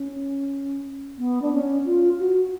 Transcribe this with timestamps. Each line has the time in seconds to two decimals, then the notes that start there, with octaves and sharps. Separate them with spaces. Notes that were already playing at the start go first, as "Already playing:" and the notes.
Already playing: C#4
1.18 B3
1.41 D4
1.52 C#4
1.85 F4
2.19 F#4